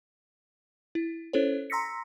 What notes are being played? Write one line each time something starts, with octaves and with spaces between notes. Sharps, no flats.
E4
C#4 E4 A4 C5 C#5
A#5 C6 E6 A#6 B6 C#7